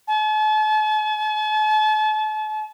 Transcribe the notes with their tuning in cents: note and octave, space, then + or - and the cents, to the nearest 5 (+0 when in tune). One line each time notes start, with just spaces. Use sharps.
A5 -40